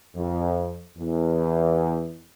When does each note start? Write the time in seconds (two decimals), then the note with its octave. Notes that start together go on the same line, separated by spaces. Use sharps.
0.16 F2
0.98 E2